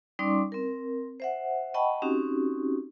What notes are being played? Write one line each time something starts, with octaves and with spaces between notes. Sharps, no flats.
G3 C#4 D#4 D5 C6 D6
C4 A#4
C5 E5 F#5
D#5 F#5 G5 A5 B5 C#6
C4 C#4 D#4 F#4 G4